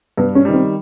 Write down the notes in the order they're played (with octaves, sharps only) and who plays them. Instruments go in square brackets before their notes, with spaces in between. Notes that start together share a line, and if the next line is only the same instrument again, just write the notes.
[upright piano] G2 [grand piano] B3
[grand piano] C#4
[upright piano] D#3 G3
[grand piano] C4